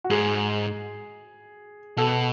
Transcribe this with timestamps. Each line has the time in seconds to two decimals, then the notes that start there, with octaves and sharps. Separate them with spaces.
0.04 F#4
0.10 G#2 G#4
1.97 B2 A4